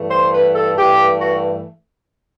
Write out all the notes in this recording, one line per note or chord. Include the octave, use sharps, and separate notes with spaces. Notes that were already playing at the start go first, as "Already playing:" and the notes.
Already playing: G2 E3 A3
C5
B4
A4
G2 E3 A3 G4
F#4